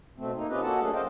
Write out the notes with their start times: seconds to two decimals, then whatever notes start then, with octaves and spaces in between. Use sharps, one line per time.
0.18 B2 A3 C4
0.35 A#3 D#4
0.49 C4 C#4 F4 G4 B4 D#5
0.62 A#3 C#4 F#4 A4 F#5 A5
0.80 F#3 A3 A#3 D4 G#4
0.93 C5 D#5 F5 G5